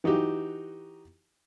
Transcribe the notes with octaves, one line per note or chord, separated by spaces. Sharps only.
E3 D#4 F#4 G4